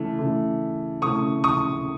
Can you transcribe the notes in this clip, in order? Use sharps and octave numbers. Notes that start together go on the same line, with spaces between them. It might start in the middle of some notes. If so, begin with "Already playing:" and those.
Already playing: C#3 E3 A3
C#3 E3 A3
C#3 E3 A3 C#6 D#6
C#6 D#6